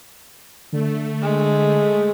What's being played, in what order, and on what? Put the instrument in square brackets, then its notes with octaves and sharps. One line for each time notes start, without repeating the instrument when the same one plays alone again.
[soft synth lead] D3 [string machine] A3
[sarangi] G#3